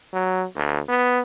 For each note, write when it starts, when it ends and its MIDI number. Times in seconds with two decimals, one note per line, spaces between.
0.13 0.45 54
0.56 0.80 38
0.89 1.21 59